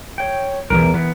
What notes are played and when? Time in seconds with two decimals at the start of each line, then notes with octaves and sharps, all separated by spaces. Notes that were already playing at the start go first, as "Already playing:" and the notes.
0.18 C#5 G5
0.70 B1 E2 G2 E3 A#4
0.94 E3 B3